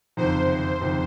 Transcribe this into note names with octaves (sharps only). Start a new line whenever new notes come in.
F#1 F2 C3 D#3 C5
F#1 F2 C3 D#3